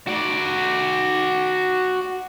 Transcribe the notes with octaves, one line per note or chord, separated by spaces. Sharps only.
F#4 D5